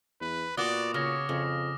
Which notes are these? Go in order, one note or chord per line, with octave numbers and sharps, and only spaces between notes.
E2 B4
A#2 B3 F#4 D5 C6 D6 D#6
C#3 C#5 F6 A#6
F2 C#3